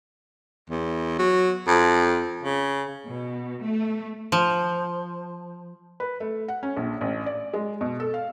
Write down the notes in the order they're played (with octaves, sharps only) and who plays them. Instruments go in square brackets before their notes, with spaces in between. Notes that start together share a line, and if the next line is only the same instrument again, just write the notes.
[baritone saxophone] E2
F#3
F2
C#3
[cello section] B2
A3
[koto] F3
[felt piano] B4
A3
F#5
C#4
A#1
A1
D5
G#3
B2
A4
F5